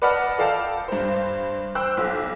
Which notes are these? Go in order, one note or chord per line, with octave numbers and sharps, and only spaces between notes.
B4 D5 D#5 F#5 A5 F6
A4 D5 F5 G5 A5
G2 C5
C5 G5 E6 F#6
B1